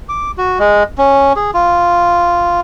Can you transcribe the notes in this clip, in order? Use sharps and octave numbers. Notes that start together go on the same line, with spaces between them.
D6
F#4
G#3
C#4
G#4
F4